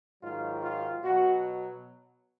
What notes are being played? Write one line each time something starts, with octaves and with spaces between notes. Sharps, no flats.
G#2 D#3 F#3 F4
F4
B2 F#3 F#4